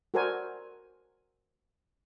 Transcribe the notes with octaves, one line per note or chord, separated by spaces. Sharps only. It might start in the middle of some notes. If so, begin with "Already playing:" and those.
F#4 A4 A#4 C5 D5 G#5